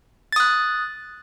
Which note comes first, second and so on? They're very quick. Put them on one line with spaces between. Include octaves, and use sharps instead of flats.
A6 D#6 F#6